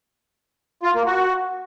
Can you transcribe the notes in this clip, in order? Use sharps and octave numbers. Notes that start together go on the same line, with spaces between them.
F4
A#3
F#4